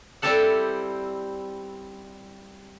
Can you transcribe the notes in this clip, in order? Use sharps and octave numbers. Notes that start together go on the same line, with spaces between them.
G3 C4 E4 G4 A4 F#5